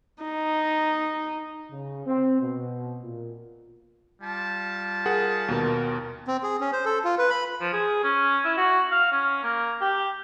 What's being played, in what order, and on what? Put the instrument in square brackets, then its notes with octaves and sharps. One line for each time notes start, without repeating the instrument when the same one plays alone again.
[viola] D#4
[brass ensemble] C#3
C4
B2
A#2
[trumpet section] G3 F4 A5
[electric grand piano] G#4 A#4 F#5
D#2 B2 A#4
[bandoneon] C4
G#4
C#4
C5
A4
F4
B4
B5
[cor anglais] F3
G#4
C#4
E4
F#4
F5
C#4
A#3
G4